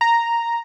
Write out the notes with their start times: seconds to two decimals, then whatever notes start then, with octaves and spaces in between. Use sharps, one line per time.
0.01 A#5